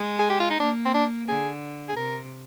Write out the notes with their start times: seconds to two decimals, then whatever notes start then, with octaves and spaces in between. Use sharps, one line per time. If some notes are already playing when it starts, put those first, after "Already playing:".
Already playing: G#3
0.19 G#4
0.30 G4
0.40 F4
0.50 D#4
0.60 A#3 D4
0.85 C4
0.94 D4
1.28 D3 G#4
1.89 G#4
1.96 C3 A#4